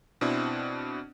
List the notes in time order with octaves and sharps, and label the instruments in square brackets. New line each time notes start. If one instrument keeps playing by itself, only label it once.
[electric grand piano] B2 C4 D4 E4